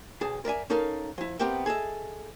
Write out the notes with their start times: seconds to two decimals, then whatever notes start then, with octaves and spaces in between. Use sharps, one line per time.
0.21 B1 G#4 A5
0.45 A#4 D5 E5 G#5
0.70 C#4 D#4 A4 A#4 F5
1.18 F3 E4
1.39 B3 C4 G4 A#4 E5 G5
1.66 G#4 A4 D#5 E5